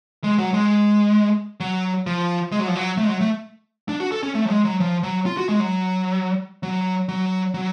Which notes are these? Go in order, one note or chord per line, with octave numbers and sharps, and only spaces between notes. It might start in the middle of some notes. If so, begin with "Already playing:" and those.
G#3
F#3
G#3
F#3
F3
G#3
F#3
F3
F#3
A3
G#3
F#3
A3
D4
F#4
A4
C#4
A3
F#3
G#3
F#3
F3
F#3
F4
F#4
G#3
F#3
F#3
F#3
F#3